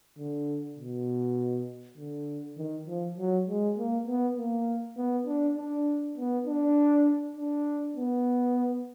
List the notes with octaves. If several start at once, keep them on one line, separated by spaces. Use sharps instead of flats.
D3
B2
D3
D#3
F3
F#3
G#3
A#3
B3
A#3
B3
D4
D4
B3
D4
D4
B3